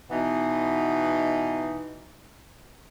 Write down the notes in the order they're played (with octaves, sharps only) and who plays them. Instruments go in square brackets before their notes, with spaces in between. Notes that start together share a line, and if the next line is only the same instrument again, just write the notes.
[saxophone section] B2 E3 B3 D#4